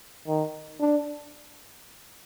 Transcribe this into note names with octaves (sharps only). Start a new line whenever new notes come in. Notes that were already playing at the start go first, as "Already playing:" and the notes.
D#3
D4